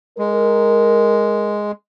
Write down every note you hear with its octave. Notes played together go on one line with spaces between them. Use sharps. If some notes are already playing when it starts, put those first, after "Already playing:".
G#3 A#4